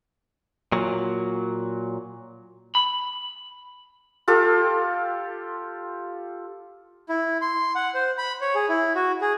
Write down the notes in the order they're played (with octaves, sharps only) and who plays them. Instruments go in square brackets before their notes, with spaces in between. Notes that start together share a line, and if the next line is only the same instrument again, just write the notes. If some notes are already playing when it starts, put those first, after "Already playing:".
[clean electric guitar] A#2 F#3
B5
[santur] F4 G4 A4
[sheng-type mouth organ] E4
C6
F#5
C5
B5
C#5
G#4
E4
F#4
G#4